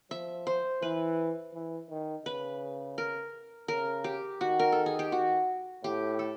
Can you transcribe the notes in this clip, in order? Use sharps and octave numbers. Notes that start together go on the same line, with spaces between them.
F3 E5
C5
E3 B4
E3
D#3
C#3 B4
A#4
C#3 A#4
G4
D#3 F#4
A#4
A4
G#4
G4
F#4
A2 G4
A4